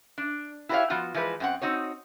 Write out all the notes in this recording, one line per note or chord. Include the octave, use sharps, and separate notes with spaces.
D4
E4 F#4 G4 A4 C#5 F5
F3 B3 F4 F#4
E3 F3 G#3 B4
F#2 C4 F#5
C4 D#4 F#4 C#5